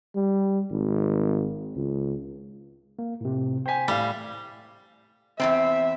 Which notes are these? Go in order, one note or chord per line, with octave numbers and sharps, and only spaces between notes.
G3
G#1
C#2
A#3
A2 C3
C5 G5 G#5 B6
A2 G3 F5
E2 A#2 C4 E5